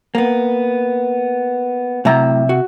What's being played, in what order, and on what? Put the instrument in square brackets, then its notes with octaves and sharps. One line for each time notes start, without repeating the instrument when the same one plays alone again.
[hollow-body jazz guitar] A#3 B3
[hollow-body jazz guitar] A2 F#3 A#5 [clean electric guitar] C3 E5
[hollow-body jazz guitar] F#4